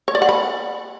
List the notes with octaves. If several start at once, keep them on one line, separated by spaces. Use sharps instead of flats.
C#5
D5
F#5
B5